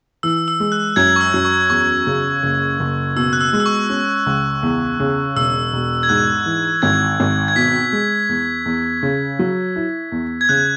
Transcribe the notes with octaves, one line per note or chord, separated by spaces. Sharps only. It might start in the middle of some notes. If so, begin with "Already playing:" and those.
E3 E6
E6
G#3
F#6
F#2 G#6
C#6
E6
F#2
C#6
E2 C#6
C#3
F#1
F#1
B2 E6
F#6
E6
G#3
E6
C#6
C#4
C#2
E2
C#3
E1 E6
E1
G#6
G#2 F#6
E3
G#1 G#6
G#1
G#6
B2 B6
G#3
E2
E2
C#3
F#3
E4
E2
G#6
C#3 F#6